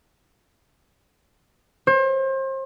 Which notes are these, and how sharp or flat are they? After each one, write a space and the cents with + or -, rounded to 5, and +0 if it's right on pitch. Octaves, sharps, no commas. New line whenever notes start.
C5 +35